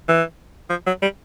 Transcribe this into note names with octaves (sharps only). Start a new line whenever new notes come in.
E3
F3
F#3
G3